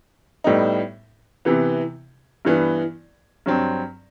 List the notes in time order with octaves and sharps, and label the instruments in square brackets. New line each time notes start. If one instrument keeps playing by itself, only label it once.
[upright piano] A2 G3 B3 D#4
C3 E3 B3
G2 E3 B3
G2 F#3 C4